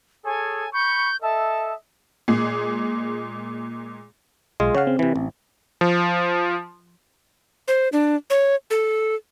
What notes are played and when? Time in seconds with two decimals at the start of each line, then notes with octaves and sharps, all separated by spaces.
0.25 G#4 A4 C#5 G#5
0.73 B5 C#6 G6
1.22 A4 D#5 E5 A5
2.28 A#2 G#3 G#4
4.60 B1 G#3 F4 G#4
4.75 C#3 C#5 F5 F#5
4.87 C4
4.99 C3 E3
5.16 A1
5.81 F3
7.68 C5
7.92 D4
8.30 C#5
8.71 A4